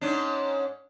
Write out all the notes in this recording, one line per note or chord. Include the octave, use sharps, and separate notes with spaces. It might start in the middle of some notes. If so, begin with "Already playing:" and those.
G#2 C#4 D4